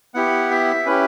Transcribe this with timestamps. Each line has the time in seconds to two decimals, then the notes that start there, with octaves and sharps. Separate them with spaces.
0.14 B3 E4 G4 F#5
0.50 E5
0.86 C#4 E4 G4 B4